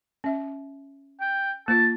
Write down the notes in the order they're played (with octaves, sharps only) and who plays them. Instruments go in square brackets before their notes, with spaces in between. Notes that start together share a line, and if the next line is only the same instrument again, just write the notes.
[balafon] C#4 E5
[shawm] G5
[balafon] A#3 F4 [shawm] A5